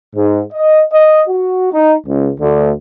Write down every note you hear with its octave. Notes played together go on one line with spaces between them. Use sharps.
G#2
D#5
D#5
F#4
D#4
C#2
D2